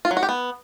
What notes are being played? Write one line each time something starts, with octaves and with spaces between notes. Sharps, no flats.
F4
F#3
F#4
G4
B3